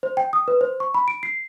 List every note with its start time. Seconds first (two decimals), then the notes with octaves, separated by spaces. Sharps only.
0.03 C5
0.17 G5
0.33 D#6
0.48 B4
0.61 C5
0.80 C#6
0.94 B5
1.08 D7
1.23 C7